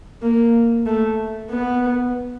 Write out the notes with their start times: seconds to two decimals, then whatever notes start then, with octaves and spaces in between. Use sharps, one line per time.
0.22 A#3
0.86 A3
1.50 B3